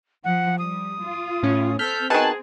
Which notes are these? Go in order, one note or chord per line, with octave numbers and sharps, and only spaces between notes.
F3 F#5
G3 D#6
F4
A2 C#4
C4 A4 F6 G6 B6
B2 D#3 G#4 G#5 A5 F#6